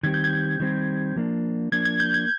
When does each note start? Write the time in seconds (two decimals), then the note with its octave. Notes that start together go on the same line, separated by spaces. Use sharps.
0.03 D#3 G3 C4 G4 G#6
0.14 G6
0.24 G#6
0.60 D#3 G3 C4 G4
1.16 F3 A#3 D4
1.72 F3 A#3 D4 G#6
1.85 G#6
2.00 G6
2.14 G#6